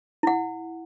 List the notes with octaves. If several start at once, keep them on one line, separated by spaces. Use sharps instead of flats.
E4 F#5